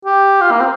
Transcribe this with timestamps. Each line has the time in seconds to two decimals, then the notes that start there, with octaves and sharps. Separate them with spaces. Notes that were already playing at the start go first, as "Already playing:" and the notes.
0.05 G4
0.41 F4
0.51 A#3
0.60 C4